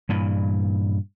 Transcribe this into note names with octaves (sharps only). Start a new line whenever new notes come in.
G2 A#2 E3